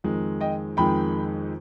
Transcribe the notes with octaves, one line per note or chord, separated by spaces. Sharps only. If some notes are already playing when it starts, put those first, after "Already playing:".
F2 D#3 G#3
D#5 G5
F2 D#3 G#3 G5 B5